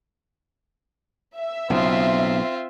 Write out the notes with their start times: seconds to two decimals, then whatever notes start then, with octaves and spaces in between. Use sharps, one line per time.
1.39 E5
1.70 B1 C#3 C4 F4